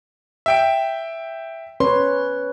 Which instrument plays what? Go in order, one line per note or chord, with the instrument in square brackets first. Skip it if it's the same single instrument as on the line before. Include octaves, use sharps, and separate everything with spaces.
[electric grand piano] E5 G5 D7
[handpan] C#4 B4 C#5 [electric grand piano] C6